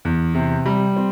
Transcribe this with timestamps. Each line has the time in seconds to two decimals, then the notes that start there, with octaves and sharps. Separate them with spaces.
0.05 E2
0.35 C3
0.66 G3
0.96 C4